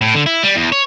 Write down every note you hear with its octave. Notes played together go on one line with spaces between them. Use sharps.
A2
D3
E4
G3
E2
C#5